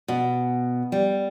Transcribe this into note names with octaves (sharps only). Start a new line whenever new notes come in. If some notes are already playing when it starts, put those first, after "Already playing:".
B2
G3